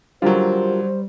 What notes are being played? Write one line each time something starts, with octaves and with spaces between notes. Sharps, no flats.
D3 F#3 G3 F4 G4 A#4 C5